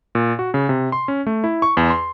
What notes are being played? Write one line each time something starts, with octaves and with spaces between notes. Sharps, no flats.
A#2
F#4
C#3
C3
C6
C#4
A3
E4
C#6
E2
C6